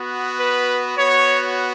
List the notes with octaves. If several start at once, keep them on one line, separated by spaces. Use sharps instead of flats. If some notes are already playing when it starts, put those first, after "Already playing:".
Already playing: B3 F#4
B4
B3 F#4 C#5